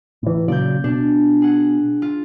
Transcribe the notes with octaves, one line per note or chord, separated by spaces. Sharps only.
A2 E3
A#2 C#3 F#3 D5 G6
B2 D4
G#4 F#5
F4